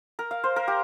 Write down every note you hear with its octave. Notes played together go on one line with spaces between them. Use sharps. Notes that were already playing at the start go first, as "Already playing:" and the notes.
A#4
F5
C5
A#4
G4